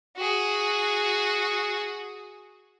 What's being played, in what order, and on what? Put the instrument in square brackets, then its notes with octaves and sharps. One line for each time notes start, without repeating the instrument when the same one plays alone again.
[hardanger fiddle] F#4 G#4